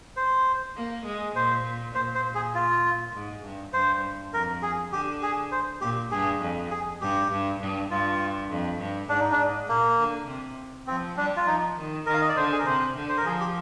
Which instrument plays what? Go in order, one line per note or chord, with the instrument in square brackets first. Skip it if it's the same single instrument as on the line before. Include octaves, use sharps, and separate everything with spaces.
[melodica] C5
[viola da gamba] A#3
G#3
[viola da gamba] A#2 [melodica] C5
[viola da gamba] A#2 [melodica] C5
[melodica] C5
G#4
F4
[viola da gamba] G#2
G2
[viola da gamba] G2 [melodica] C5
[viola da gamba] F2 [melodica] A#4
[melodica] G#4
[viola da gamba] D3 [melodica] G4
[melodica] G#4
C5
[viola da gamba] A#2 [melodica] G4
[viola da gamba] G2 [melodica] G#4
[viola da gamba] F2
[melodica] G#4
[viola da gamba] G2 [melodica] G4
[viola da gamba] G2
G2
[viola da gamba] G2 [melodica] F4
[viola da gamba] F2
G2
[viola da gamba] G#2 [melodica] D4
[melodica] D#4
D4
[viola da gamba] G#2
[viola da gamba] A#2 [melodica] A#3
[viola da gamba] D3
C3
[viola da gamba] F3 [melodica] C4
[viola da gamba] G3 [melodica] D4
[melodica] F4
[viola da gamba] F3 [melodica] D#4
[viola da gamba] D#3
[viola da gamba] D#3 [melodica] A#4
[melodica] F5
D#5
D5
[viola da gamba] D3 [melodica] C5
[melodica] G#4
A#4
[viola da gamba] C3 [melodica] C5
[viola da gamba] D3
[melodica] C5
A#4
[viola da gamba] F3 [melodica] G#4
[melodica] G4